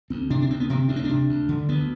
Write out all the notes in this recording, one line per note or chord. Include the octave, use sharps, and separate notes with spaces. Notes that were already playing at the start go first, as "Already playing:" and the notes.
D2 C4
C3 D4
D4
D2 C4
B3
C3 C4
D2 D4
C4
C3 D4
D2
D3
D2 B3